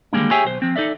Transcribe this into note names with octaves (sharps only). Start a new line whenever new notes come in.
D3 D#3 G3 G#3 A#3 D4
G4 G#4 C#5 E5 G5 G#5
B1 C5
F3 C4
D#4 A4 D5 E5